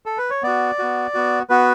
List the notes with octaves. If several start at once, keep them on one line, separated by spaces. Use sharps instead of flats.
A4
B4
C#5
B3 F#4 D5
B3 F#4
B3 F#4
B3 F#4 B4